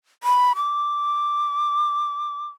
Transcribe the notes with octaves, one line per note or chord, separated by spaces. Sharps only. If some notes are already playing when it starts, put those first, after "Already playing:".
B5
D6